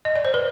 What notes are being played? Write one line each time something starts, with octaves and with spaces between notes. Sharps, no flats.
D#5
D5
C5
B4